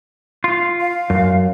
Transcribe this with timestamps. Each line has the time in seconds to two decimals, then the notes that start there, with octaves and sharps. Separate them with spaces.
0.44 F4
0.80 F5
1.10 F#2